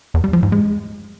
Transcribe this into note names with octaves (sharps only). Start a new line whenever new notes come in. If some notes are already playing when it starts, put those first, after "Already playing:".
E2
G3
F3
G#2
G#3